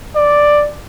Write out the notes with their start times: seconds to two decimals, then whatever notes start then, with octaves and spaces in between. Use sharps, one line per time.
0.16 D5